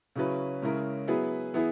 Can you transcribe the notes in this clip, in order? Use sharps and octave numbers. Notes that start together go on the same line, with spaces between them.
C#3 F#3 C#4 E4 B4
C#3 G#3 C#4 E4 A#4
F#3 B3 E4 G#4 B4
E3 B3 E4 G#4